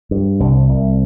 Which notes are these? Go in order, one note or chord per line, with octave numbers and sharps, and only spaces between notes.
G2
C2
C2